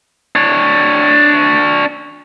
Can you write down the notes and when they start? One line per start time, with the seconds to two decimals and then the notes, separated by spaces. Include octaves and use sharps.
0.35 D4 C#5